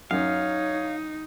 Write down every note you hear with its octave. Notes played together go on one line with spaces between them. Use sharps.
F#2 D#4 C#5 F5